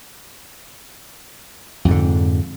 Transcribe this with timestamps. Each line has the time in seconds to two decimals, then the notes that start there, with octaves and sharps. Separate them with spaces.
1.85 F2
1.88 G#2
1.91 D3